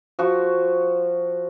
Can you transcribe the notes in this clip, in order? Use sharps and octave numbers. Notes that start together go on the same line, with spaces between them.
F3 F#4 C#6